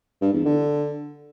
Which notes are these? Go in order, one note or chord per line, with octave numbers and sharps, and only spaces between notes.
G2
E2
D3